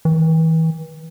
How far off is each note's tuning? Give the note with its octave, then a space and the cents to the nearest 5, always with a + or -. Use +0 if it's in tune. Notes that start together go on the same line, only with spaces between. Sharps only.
E3 -35